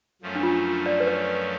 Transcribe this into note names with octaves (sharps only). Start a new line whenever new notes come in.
F#2 F3 A3 C#4
D4
F4
D5
B4
C#5